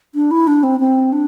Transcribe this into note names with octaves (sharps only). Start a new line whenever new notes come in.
D4
E4
D4
C4
C4
D4